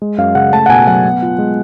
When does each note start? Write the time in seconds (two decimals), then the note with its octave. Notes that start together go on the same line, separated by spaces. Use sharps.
0.02 G#3
0.18 F#2 F5
0.35 C#3 F#5
0.53 A3 A5
0.66 F#5
0.69 B2 G#5
0.87 F#3 F#5
1.05 B3
1.22 F4
1.39 G#3